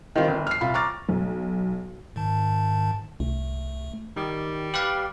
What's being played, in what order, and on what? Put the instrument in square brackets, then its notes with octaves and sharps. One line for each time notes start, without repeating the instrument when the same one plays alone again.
[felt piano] D#3 G3 C4 F4
G1
F6 C7
C2 F4 B5
A#5 C#6 D6 F6 A6
[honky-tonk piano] B1
[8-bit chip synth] G#2 D#3 A5
[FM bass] C2 [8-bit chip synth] A3
[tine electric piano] D#3 [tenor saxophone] G3
[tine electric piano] G4 B4 F5